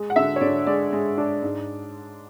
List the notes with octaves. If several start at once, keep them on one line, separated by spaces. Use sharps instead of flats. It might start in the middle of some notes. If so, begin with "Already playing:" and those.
Already playing: G#3
F#5
D3 E5
C#5
D3 D5
G#3 D5
G#3
D4
G#2